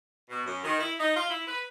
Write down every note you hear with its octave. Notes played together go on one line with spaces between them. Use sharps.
B2
F#2
D#3
E4
D#4
F4
E4
B4